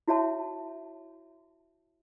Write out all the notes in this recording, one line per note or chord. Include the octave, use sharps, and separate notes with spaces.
E4 F#4 C#5 E5 A5 C#6